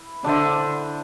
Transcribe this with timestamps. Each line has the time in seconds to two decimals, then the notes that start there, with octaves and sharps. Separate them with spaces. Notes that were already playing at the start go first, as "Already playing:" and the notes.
Already playing: E4 B4
0.24 D3 D4 A4 C5 E5